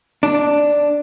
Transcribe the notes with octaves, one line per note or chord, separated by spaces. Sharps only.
D4